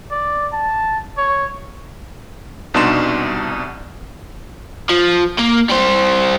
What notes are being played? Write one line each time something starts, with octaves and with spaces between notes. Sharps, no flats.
D5
A5
C#5
C2 B2 D4 D#4 C6 E7
F3
A#3
G3 C5